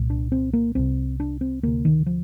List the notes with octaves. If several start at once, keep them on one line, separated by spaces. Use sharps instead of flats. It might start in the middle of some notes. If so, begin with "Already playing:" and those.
Already playing: C2 A#2
D4
C4
A#3
C2 C3 C4
D4
C4
D2 C3 A#3
D#3
F3